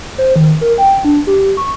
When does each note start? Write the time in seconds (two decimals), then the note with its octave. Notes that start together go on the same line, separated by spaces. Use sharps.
0.18 C5
0.36 D#3
0.61 A#4
0.78 G5
1.05 D4
1.27 G4
1.57 C#6